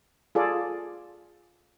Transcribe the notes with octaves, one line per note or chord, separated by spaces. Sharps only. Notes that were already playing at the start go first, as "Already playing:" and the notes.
F4 G#4 A4 D5